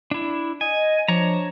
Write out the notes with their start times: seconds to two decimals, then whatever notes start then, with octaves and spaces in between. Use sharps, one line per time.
0.11 D4 E4
0.61 D#5 G#5
1.08 F3 D4 C#5 A#5